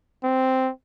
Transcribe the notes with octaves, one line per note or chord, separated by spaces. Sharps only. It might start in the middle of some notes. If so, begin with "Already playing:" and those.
C4